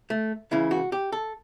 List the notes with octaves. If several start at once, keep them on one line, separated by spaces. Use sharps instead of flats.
A3
C#2 C#3 E3 E4
F#4
G4
A4